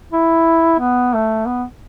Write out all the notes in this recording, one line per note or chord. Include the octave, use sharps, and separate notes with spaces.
E4
B3
A3
B3